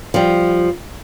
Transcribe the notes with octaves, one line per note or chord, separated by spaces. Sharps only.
F3 G3